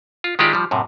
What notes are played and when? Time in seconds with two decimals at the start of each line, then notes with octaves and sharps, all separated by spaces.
0.24 F4
0.39 D#3 G#3 E4 F4 G4 D5
0.53 F3 G3
0.71 F#2 A2 C3